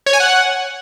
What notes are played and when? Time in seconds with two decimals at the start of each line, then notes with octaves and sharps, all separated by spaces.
0.06 C#5
0.13 G#5
0.20 F#5